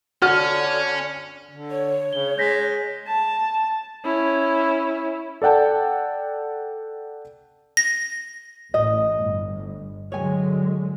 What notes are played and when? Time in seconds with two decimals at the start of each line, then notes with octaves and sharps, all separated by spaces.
0.22 D3 C#4 F#4 F#5 F6 A6
1.51 D3
1.71 C#5
2.13 C#3 G7
2.38 G#3 G6 A#6 B6
3.08 A5
4.05 C#4 E4
5.42 A4 D5 F#5 G5 A5
7.77 A#6
8.74 A1 A2 D#5
9.22 G1
10.12 D3 F#3 G#3 C#5 G#5